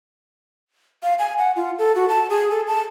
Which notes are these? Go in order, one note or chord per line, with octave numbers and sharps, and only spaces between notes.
F5
G#5
F#5
F4
A4
F#4
A5
G#4
A4
A5